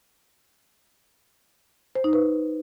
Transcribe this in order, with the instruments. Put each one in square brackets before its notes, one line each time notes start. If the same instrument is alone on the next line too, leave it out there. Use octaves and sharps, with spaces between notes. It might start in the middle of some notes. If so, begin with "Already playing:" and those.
[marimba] C5
D#4
B4